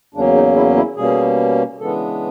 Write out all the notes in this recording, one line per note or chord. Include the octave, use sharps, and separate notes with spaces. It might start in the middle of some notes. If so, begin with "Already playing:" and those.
E2 C#3 F#3 A#3 C#4 D4
D#4
E4
E4
B2 G3 A#3 C#4 G#4
C#3 E3 G#3 B3 D4 A4